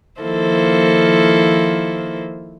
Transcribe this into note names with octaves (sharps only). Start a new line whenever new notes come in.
D#3 F3 A#3 E4 A4 C5